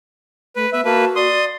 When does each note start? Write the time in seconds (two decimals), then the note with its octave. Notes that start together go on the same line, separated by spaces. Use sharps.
0.56 A3 B4
0.73 B3 B4 E5
0.85 A#3 F#4 B4 A5
1.16 D5 C6 D#6